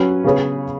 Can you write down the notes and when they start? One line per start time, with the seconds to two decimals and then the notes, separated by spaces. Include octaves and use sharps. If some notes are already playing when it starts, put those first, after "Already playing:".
Already playing: F#3 C#4 B4
0.24 C#3 B3 G#4 C#5